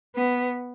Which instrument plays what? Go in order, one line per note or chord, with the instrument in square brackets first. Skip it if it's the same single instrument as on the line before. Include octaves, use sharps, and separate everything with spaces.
[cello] B3